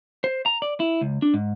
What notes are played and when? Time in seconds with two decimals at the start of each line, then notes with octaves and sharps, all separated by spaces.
0.24 C5
0.46 A#5
0.62 D5
0.80 E4
1.01 C#2
1.22 D4
1.34 G#2